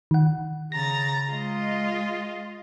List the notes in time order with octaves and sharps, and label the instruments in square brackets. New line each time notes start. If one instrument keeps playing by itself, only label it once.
[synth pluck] D#3 F#5
[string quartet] C#3 A#5 A6 [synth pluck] A#6
[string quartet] G#3 F4 D#5